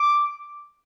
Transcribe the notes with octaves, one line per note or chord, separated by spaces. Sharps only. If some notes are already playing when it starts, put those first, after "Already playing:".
Already playing: D6